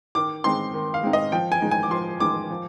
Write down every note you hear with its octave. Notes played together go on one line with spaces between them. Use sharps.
D#3 D6
G#3 C4 D#4 C6
D#3
F5
G#3 C4 D#4
D#5
F3 G5
G#5
G#3 D#4
G#5
D6
F3 C6
G#3 D#4 D6
F3